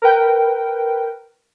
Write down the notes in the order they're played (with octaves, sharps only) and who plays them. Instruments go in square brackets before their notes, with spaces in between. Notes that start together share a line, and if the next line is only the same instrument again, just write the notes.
[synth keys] A#4 B4 G5